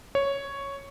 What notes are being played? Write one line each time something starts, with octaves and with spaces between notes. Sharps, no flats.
C#5